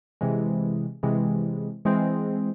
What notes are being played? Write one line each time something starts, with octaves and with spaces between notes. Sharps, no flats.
C3 E3 G#3
C3 E3 G#3
E3 G#3 C4